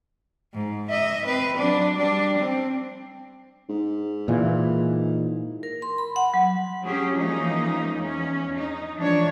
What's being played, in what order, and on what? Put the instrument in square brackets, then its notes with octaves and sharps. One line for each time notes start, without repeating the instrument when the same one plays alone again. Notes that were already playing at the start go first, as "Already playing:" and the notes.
[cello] G#2
D#5 E5
C4 B4
F#3 D4
G3 D4
C4
[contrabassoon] G#2
[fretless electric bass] A#2 E3
[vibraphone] A#4
C6
B5
F#5
F#3
[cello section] F#3 C#4 G4 G#4
E3 F3 G#3 A#3 C#4 D#4
E2 C#4
D#4
E3 F3 G#3 D4 C#5